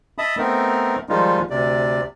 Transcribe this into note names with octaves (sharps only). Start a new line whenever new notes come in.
D#5 E5 A5 B5 D#6
A3 B3 C4 D#4 A#4
D#3 F3 G3 G#3 D#4 F4
D2 C3 D5